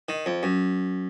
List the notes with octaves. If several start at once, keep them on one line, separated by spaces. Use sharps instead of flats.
D#3
F2
F#2